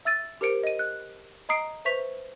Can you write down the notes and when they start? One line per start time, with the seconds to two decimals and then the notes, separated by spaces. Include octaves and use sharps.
0.05 E5 E6 A6 D#7
0.41 G4 A#4 C5 C#7 D7
0.63 D#5 D#7
0.79 F#6
1.49 D#5 A#5 D#6 C7 D7
1.85 B4 C5 E5 C#6 B6 F7